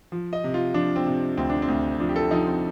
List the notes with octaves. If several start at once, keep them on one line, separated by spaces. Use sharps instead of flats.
F3
D#5
C3
F4
F3 D4
C4
C3
D2 C4
D4
C4
D2
F3 D4
G4
A4
F3 D#4
C4